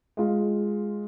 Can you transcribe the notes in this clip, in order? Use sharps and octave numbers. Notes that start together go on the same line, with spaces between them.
G#3 F4